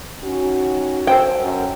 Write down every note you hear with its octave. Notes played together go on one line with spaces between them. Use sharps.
D#3 C#4 F#4
A4 C5 G5
F#2